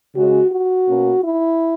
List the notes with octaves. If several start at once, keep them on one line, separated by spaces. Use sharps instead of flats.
C#3 G#3 C#4 F#4
F#4
B2 A#3 C#4
E4